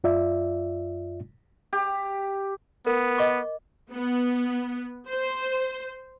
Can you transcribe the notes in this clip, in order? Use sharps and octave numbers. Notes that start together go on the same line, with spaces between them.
F#2 F4 D5 E5
G4
B3 A#4
D#5 C#6 D6
B3
C5